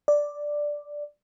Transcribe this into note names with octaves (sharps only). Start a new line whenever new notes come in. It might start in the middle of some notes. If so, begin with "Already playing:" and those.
D5